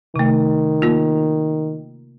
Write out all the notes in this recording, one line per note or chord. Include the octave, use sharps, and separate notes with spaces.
C3 D#3 A3
A#3 F4